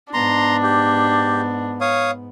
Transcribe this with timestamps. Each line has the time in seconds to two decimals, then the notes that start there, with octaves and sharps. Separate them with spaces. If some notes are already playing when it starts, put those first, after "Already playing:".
0.14 G#2 B3 D4 A#5 C6
0.63 G4
1.81 C#5 F5 D#6